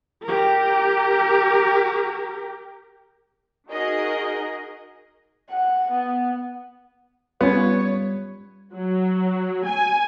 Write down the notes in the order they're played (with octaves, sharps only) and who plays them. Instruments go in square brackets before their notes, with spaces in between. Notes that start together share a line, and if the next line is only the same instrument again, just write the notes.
[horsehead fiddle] G4 A#4
[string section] D#4 F#4 G#4 A#4 D#5
[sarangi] F#5
B3
[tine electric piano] G3 [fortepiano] B3 [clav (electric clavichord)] C#4 F4 [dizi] C#5
[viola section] F#3
G#5